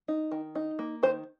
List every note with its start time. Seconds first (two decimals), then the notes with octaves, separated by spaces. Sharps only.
0.08 D#4
0.32 D#3
0.55 D#4
0.79 A#3
1.03 D#3 C5